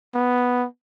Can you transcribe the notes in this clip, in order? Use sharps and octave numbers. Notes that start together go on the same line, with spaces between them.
B3